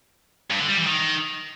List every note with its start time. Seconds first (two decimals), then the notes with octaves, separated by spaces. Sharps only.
0.50 G2
0.59 D3
0.68 G3
0.77 E3
0.87 D#3